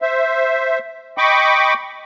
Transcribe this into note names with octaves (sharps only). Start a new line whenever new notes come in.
C5 E5
D#5 G5 B5 C#6 D6